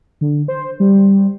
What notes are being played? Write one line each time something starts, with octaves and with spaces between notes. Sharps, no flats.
D3
C5
G3